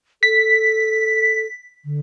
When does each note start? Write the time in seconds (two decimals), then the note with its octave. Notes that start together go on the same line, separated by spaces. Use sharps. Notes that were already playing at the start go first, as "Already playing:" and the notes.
0.23 A4 B6
1.85 D3